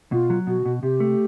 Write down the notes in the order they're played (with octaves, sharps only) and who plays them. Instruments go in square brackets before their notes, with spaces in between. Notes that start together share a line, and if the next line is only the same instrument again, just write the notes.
[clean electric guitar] B2 [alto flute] F4
[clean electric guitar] F#3
[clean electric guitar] B2 [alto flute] F#4
[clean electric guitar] B2
[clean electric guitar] C3 [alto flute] G4
[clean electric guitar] A3